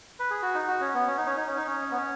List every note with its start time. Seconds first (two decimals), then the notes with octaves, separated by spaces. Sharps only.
0.19 B4
0.30 G#4
0.42 F#4
0.55 D#4
0.68 F#4
0.81 C#4
0.94 B3
1.07 C#4
1.17 D#4
1.26 C#4
1.37 D#4
1.47 C#4
1.57 D#4
1.67 C#4
1.91 B3
1.97 C#4